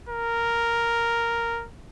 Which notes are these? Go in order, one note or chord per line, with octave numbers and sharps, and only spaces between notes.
A#4